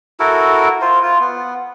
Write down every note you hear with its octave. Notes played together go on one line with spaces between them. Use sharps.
E4 F#4 A4 A#4
F4 C5
F4
B3